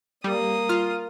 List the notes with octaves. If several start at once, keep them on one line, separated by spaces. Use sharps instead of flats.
G3 A#3 D#6
F4 F6